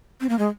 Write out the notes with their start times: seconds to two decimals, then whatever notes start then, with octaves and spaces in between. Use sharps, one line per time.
0.21 C4
0.29 A#3
0.39 G#3